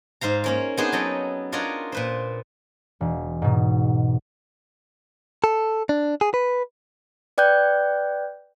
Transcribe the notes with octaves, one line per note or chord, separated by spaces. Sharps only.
G#2 C5 F5 A#5
A#3 C#4 A#4
B3 C4 D4 D#4 G#4 C5
F#3 C#4 A4 D#5 G5
D4 F4 A#4 C#5 D#5 F#5
A#2 B4 C5
E1
G#2 B2
A4
D4
G#4
B4
B4 D5 G5 F#6 G6